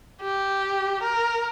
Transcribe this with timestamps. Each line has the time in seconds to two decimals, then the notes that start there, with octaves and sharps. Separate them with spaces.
0.22 G4
1.03 A#4